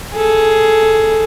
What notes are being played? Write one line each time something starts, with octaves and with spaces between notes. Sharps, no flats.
G#4 A4